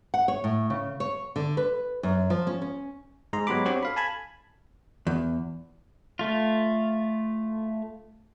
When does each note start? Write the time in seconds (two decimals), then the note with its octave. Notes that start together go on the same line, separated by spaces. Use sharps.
0.14 F#5
0.28 C#5
0.44 A2
0.70 C#3
1.00 C#5
1.36 D3
1.57 B4
2.03 F#2
2.30 F3
2.47 C#4
2.62 C#4
3.33 G#2 G#4 A#5 C6
3.47 F#3 G#3 B3 G4 B5 D6
3.65 C4 D4 F#4 G4 C5 C#5
3.83 A4 F5 B5
3.96 G#5 A5 B5 G#6
5.07 E2
6.19 A3 F4